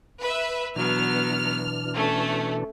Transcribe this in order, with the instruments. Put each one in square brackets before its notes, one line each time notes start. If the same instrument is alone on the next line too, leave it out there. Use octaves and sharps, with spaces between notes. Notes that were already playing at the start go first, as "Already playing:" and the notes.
[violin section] B4 E5
[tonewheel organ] B2 E3 D4 [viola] F#3 B3 [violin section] F6
[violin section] A3 [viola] C#4